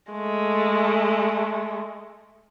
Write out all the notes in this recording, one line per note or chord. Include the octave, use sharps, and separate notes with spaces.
G#3 A3